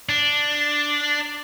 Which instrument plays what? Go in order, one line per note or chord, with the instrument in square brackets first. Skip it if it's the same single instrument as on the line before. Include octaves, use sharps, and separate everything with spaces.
[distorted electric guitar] D4